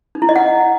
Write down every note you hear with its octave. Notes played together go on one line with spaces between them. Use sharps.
D#4
E4
D#5
F#5